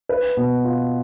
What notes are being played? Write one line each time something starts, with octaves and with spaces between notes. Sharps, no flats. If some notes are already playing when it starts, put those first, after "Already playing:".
B4
B2
F4